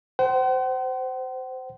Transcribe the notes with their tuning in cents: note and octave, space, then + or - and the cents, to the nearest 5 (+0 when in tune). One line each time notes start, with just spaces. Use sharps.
C5 -15 F#5 +45